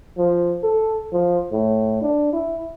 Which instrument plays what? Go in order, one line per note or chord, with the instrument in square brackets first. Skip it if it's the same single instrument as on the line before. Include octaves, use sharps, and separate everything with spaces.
[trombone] F3
A4
F3
A2
D4
E4